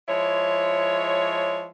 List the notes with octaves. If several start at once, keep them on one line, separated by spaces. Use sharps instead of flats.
F3 G#3 E4 C#5